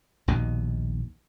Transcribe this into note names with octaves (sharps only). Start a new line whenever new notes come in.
A#1 D#2 B2 D#3